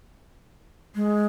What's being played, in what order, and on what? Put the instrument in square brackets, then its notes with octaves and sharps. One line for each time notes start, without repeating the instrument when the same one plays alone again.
[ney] G#3